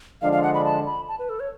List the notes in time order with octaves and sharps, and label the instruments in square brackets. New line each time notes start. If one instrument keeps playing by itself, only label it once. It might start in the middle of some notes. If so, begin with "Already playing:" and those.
[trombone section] D3 F3 G#3 D4 [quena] F5
[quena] F5
F#5
B5
A5
B5
A5
B4
A4
C#5